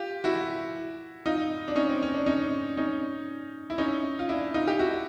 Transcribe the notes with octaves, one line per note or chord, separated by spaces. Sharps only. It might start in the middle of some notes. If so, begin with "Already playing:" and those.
Already playing: F4 G4
E4 F#4
D#4 F4
D4
C#4 D#4
C4
C#4
D4
C#4 D#4
C#4 D#4
E4
C#4 D#4
F4
D4 E4
D#4 F4
G4
E4 F#4